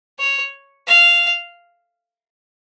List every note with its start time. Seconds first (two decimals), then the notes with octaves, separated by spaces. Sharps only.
0.19 C#5
0.87 F5